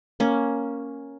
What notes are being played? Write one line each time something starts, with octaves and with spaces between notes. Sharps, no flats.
A#3 C#4